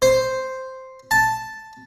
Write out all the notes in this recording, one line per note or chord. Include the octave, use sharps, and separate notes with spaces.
C5
A5